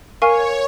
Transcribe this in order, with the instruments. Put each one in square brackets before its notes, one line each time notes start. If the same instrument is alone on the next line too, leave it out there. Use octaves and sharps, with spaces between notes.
[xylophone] A#4 F5 G#5 C#6 F6 [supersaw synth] C#5